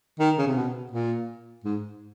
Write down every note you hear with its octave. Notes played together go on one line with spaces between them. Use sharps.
D#3
C#3
C3
B2
A#2
G#2